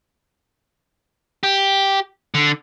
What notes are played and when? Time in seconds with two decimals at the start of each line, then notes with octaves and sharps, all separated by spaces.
1.43 G4
2.34 D3